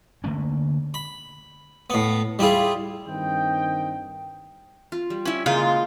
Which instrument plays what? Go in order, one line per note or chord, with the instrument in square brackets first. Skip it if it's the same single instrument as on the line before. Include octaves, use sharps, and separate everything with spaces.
[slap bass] D3 A3 A#3 C#4
[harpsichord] B5
A2 B3
G3 E4 F4 G#4
[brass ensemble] G2 D#3 C4 D#5 G5
[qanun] F4
G3
[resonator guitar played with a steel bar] C#4 E4
[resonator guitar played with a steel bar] C#3 [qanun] G#3 A#3 [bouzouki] F4